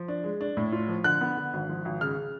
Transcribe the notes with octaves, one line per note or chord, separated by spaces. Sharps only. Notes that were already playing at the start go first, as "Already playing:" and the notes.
Already playing: F3
D4
G#3
D4
A2
F4
F3
D3 F#6
B3
D3
G#1
F3
G#1
C#3 F6
C#3